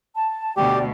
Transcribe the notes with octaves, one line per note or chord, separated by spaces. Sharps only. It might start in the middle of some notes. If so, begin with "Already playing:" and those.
A5
D2 B2 G4 D5 G5